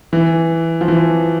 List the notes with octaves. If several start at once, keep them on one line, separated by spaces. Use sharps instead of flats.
E3
F3
E3